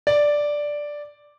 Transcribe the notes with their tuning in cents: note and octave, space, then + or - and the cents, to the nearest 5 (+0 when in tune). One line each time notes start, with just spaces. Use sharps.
D5 +0